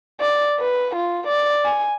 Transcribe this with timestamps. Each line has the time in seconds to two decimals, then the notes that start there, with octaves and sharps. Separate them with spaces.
0.20 D5
0.59 B4
0.95 F4
1.27 D5
1.65 G#5